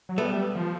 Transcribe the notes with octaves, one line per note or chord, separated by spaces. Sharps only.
F#3
G3 A3 B3
F3